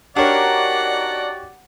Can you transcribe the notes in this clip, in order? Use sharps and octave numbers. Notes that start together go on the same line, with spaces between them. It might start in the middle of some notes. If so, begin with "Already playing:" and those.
D4 D#4 F#4 G4 A#4 C#5 D5 F#5